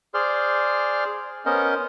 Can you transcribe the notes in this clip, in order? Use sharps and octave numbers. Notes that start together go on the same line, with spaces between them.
G#4 C5 D5 C6 F6
B3 C#4 A#4 C5 D#5